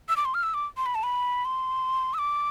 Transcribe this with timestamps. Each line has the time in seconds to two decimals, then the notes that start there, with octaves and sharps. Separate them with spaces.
0.09 E6
0.17 D6
0.25 C6
0.34 F6
0.43 E6
0.54 D6
0.77 C6
0.86 B5
0.95 A5
1.03 B5
1.45 C6
2.14 E6
2.18 D6